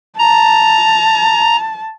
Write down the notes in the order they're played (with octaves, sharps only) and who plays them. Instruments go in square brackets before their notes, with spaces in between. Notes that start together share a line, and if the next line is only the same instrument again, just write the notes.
[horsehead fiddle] A5 [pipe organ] A#5